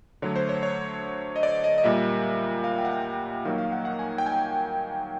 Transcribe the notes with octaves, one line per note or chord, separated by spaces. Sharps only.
D3 F#3 A3 C#5
C5
C#5
C#5
D#5
D5
D#5
D#5
A#2 G3 A#3 E5
F5
G5
F#5
D#3 F#3 A#3 F5
F5
F#5
F#5
G#5
G5
G#5